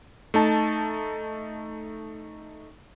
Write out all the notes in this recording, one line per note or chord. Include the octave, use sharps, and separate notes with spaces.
A3 D#4 A5